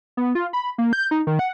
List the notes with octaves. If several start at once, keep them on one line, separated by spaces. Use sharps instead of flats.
B3
F4
B5
A#3
G6
D#4
D#3
F#5